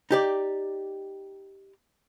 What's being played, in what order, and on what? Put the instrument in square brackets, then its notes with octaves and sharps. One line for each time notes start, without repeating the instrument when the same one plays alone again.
[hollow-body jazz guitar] D#4 G4 D5